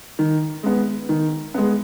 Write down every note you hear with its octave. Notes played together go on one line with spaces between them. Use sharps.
D#3
G#3 B3
D#3
G#3 B3